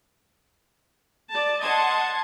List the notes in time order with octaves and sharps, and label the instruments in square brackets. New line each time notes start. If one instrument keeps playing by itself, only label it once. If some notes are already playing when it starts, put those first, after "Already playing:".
[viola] D5 A5
[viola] D#5 F#5 [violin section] A5 C6 G#6